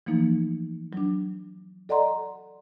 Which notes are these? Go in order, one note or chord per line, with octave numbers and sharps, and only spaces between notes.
E3 F3 A3 A#3 D#4
F#3 D4
A4 D5 D#5 F#5 A#5 C6